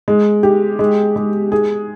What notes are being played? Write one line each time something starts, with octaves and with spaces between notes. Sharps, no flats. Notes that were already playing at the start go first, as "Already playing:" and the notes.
G#3
G4
G#3
G#3
G#4